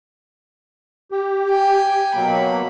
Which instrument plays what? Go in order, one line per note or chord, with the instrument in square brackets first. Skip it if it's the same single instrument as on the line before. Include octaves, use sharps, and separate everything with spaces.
[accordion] G4
[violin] G5 G#5
[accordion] B2 F#3 A#3 [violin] B5